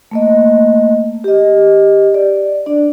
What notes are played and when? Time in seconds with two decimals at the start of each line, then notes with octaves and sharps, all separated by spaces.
0.11 A3 A#3 D#5
1.24 G4 D#5
2.14 D5
2.66 D4 D5